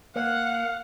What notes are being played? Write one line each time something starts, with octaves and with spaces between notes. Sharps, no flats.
A#3 F5 F#5